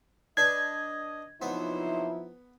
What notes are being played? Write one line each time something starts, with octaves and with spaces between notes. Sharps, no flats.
D4 B4 D#5 G#6
C3 F3 F#3 B3 D#4 E4 C5